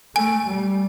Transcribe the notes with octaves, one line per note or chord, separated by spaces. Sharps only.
A3 G#5
G3